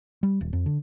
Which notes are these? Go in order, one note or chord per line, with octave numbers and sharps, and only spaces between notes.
G3
D#1
F2
D3